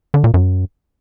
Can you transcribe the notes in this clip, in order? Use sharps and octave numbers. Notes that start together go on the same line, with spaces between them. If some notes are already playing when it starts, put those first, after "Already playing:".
D3
A#2
F#2